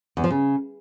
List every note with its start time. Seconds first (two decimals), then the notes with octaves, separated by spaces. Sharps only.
0.17 E2
0.24 F3
0.31 C#3